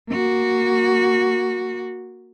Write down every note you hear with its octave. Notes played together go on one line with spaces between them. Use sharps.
A#3 F#4